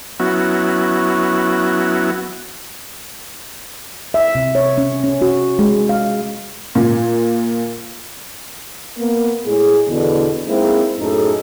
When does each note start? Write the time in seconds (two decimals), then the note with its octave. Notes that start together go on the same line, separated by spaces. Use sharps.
0.20 F#3 B3 C#4 E4 F#4
4.14 E5
4.35 C3
4.55 C#5
4.78 C#4
5.04 C#4
5.22 F#4
5.59 G#3
5.89 F5
6.75 A#2
8.98 A#3 B3
9.45 A2 G#3 G#4
9.89 E2 B2 D3
10.48 G#3 A#3 C4 D#4 E4
10.99 F#2 A2 D#4 G#4 A4